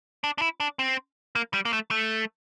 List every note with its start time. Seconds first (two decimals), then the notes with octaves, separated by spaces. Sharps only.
0.24 D4
0.38 D4
0.42 E4
0.60 D4
0.79 C4
1.35 A#3
1.54 G3
1.65 A#3
1.73 A3
1.91 A3